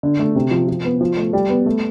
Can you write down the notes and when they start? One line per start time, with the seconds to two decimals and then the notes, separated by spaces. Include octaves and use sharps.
0.03 D3
0.19 A3
0.35 C3
0.51 F3
0.68 F3
0.84 B3
1.01 F3
1.17 A3
1.33 G3
1.49 B3
1.66 A3